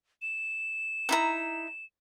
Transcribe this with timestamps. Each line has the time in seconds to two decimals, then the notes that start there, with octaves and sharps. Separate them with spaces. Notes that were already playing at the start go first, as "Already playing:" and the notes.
0.22 E7
1.09 D#4 E4 A#5